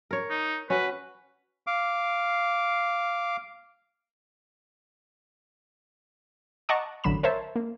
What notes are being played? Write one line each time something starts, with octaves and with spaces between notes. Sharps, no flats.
A#4 C#5
D#4
C#4 F#4 B4
F5 D6
D#5 F#5 A5 A#5 C#6 D6
A1 D3 F#3 B5 E7
A#4 C5 C#5 E5 A5
A#3